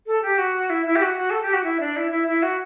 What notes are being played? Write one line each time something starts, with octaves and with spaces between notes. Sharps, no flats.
A4
G4
F#4
E4
E4
G4
F#4
F#4
A4
G4
F#4
E4
D4
E4
E4
E4
F#4